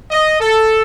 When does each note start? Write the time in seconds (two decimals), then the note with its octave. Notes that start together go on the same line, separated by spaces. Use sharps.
0.11 D#5
0.39 A4